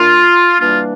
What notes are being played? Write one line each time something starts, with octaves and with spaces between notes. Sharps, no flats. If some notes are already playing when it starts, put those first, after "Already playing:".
Already playing: A#2 A3 D4 F4
E3 G3 A#3 D4 F4